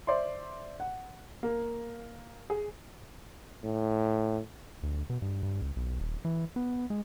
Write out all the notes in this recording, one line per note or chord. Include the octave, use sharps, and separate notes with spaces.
C5 D5 E5 C6
F#5
A#3
G#4
A2
D2
B2
G2
G2
C#2
B1
D#1
E3
B3
G#3